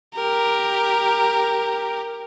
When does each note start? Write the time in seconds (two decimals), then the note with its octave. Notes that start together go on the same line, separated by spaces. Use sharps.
0.15 G4 A#4